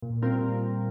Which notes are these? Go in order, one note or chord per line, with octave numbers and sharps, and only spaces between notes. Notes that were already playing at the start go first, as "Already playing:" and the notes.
A#2
G3 C4 F4 A#4
A#2